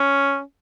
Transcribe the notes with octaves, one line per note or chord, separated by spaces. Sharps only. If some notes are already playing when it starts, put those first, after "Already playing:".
Already playing: C#4